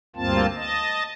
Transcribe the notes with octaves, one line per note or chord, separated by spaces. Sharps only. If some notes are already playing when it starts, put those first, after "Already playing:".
D2 G2 A#3 C4 F4 A5
D#5 A5